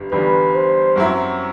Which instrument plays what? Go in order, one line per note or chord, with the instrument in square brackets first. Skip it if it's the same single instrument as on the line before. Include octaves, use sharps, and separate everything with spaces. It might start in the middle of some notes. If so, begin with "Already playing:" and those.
Already playing: [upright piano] G1 G2 G3
[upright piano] G1 G2 E3 G3 [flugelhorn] B4
[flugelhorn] C5
[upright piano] F#2 F#3 C4 E4